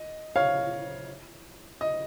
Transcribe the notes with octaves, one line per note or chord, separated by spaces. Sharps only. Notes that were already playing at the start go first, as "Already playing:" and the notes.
Already playing: D#5
C#5 F5
D#5